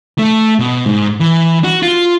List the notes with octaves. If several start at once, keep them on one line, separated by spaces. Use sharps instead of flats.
A3
B2
G#2
E3
F#4
F4